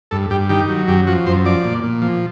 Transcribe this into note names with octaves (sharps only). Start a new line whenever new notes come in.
G2 A4
G2 G4
D#3 G4
F#3
F#2 G4
F3 F#4
F#2 C5
F3 D5
A#2
A#2
F3